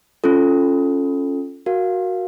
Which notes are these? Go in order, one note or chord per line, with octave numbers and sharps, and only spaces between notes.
C#4 F4 A4
F#4 A#4 F5